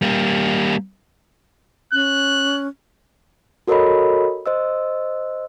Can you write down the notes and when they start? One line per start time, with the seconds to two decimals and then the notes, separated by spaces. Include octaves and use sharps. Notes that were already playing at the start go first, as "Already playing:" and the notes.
0.01 G3 A#3
1.93 C#4 F#6
3.68 F#4 A4 A#4 C#5 D#5 B5
4.46 C5 D#5 E6